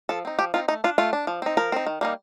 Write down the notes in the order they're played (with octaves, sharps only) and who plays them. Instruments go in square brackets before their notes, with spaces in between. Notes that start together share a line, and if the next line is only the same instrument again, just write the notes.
[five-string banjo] F3 A4
C4 D#4
F3 G4
C4 D#4 F4
A3 D#4
D4 F4
A3 F4
D4
F3
C4 D#4
F3 A#4
C4 D#4
D#3
G3 A#3 D#4